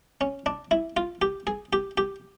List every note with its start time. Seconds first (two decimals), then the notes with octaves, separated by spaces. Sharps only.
0.21 C#4
0.46 D4
0.71 E4
0.97 F4
1.22 G4
1.47 G#4
1.73 G4
1.98 G4